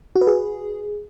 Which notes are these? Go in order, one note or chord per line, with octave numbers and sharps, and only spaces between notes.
F#4
B4
G#4